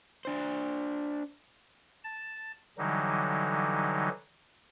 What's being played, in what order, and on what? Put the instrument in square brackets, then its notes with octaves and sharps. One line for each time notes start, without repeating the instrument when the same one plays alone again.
[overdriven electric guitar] D4 C5
[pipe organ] A5
D3 E3 F#3 G3 D#4